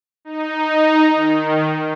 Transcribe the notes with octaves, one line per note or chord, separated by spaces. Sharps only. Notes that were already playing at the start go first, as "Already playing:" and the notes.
D#4
D#3